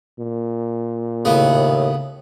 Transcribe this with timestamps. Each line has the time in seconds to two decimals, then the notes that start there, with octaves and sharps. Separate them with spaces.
0.19 A#2
1.25 D#2 A2 C#3 B3